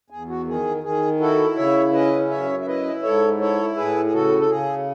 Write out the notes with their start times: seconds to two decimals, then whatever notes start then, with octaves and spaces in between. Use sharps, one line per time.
0.10 E2 G#4
0.29 F#4
0.46 D#3 G#4
0.83 D#3 G#4
1.20 E4 F#4 A4
1.57 C#3 C#5 E5
1.93 C#4 B4 D#5
2.30 F#2 C#5 E5
2.60 E5
2.67 E4 B4 D#5
3.03 G#2 A4 C#5
3.40 E4 A4 C#5
3.76 A2 G#4 B4
4.05 G#4
4.13 C#3 F#4 A4
4.38 A4
4.49 C#3 G#4